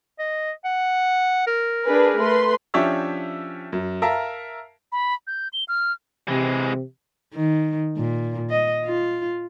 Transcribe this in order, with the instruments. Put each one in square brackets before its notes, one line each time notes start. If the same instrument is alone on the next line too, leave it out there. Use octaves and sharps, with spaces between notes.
[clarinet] D#5
F#5
A#4
[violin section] D4 G#4 B4
A3 B4 C6
[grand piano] F3 C#4 D4 G4 C#5 E5
F#2
A#4 E5 F5 A5 A#5
[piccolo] B5
G6
G7
F6
[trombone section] C3 [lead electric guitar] E3 G#3
[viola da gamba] D#3
A#2
D#5
F4